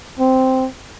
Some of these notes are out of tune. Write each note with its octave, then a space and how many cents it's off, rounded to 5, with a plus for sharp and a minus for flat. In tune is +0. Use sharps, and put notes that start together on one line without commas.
C4 -5